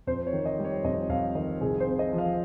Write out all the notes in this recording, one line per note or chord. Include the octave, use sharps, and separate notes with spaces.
F2 C5
C#5
D#3
D#5
G3
C#5
F2 D#5
F2 F5
D#3 D#5
C2 G#4
C5
C3
D#5
F3
F5